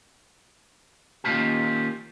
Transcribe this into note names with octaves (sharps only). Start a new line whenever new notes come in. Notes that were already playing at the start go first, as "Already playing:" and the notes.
D#3 F3 A#3 C#4 F4 G4